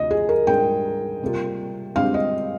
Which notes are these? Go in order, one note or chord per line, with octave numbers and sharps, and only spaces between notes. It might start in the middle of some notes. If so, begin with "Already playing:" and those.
Already playing: D2 C3 F3 D#5
G#4
A#4
G#2 G3 D4 G#4 G5
C3 G3 A#3 F4
G2 D3 G#3 C4 G4 F5
D#5